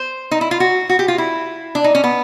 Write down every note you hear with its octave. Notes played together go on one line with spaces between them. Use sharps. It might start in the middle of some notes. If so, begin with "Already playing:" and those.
Already playing: C5
D#4
E4
F4
F#4
F#4
G4
F4
E4
D4
D#4
C#4
B3